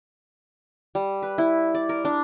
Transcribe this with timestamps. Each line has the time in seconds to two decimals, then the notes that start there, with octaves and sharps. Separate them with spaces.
0.95 G3
1.23 B4
1.38 E4
1.75 D5
1.89 A#4
2.05 D4